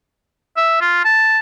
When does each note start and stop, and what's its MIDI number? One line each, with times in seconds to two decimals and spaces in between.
0.57 0.76 76
0.81 1.03 65
1.04 1.39 81